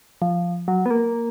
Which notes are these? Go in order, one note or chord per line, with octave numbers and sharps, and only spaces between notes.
F3
F#3
B3
A#3